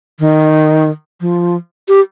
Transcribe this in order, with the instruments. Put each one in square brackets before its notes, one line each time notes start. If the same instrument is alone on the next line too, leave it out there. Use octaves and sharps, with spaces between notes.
[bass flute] D#3
F3
G4